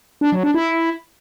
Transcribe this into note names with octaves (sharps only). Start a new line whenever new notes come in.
D4
F#3
D4
E4